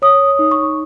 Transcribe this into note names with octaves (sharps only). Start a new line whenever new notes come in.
C#5 D#6
D#4
C#6